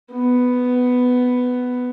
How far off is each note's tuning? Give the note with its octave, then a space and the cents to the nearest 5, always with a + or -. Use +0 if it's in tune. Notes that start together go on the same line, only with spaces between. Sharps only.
B3 +10